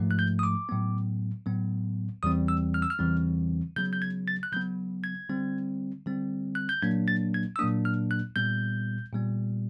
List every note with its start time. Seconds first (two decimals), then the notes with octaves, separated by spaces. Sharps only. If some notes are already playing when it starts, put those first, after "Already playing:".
Already playing: G#2 F3 A3
0.11 F#6
0.19 G6
0.39 D#6
0.43 D6
0.69 A2 F#3 B3
1.46 A2 F#3 B3
2.23 E2 C#3 E3 G3 C4 D#6
2.48 E6
2.74 F6
2.82 E6
2.90 F6
2.99 E2 C#3 E3 G3 C4
3.76 C#3 F#3 B3 G6
3.93 G6
4.02 G#6
4.28 A6
4.43 F#6
4.53 C#3 F#3 B3 G6
5.04 G#6
5.29 D3 G3 C4
6.06 D3 G3 C4
6.55 F#6
6.69 G6
6.82 A#2 F#3 A#3 D4 G#6
7.08 A6
7.34 G#6
7.56 E6
7.59 A#2 F#3 A#3 D4 D#6
7.85 F6
8.11 F#6
8.36 A#2 G3 B3 G6
9.12 A#2 G3 B3